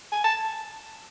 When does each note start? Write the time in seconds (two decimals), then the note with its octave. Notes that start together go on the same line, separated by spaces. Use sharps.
0.12 G#5
0.24 A5